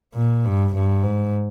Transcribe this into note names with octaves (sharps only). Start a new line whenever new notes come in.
A#2
G2
G2
G#2